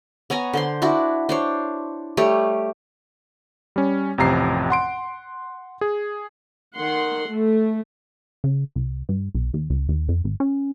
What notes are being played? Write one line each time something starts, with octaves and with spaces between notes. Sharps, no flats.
B3 C#5 G#5 A#5
D3 C5 C6
D4 E4 F#4
D4 C5 C#5
G3 A3 G4 C#5
G3 C#4
A1 F2 C3 A#5 C7
F#5 C6 D7
G#4
D#3 F#5 C6
A3
C#3
C2
G2
B1
D#2
C#2
D#2
F2
G#1
C#4